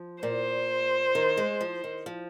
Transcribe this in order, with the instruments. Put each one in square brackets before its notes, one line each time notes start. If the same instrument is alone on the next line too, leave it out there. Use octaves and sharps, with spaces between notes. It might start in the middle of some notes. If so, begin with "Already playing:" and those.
Already playing: [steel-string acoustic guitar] F3
[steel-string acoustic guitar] A#2 [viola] C5
[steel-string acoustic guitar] D#3
G#3
F3
D#3
F3